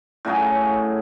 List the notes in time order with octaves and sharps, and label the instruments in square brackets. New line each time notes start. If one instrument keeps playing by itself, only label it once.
[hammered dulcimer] A2 C#3 F#3 G#4